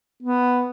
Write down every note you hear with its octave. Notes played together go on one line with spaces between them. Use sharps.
B3